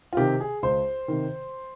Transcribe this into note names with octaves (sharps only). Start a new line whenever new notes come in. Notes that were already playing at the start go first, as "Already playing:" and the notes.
F4
C3 D#3 G4
G#4
C#2 C5
C3 D#3